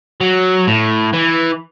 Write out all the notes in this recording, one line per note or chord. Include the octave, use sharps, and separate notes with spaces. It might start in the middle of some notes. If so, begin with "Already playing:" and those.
F#3
A2
E3